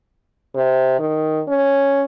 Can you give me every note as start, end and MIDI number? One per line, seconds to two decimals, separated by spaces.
0.55 0.96 48
0.99 1.42 51
1.48 2.04 61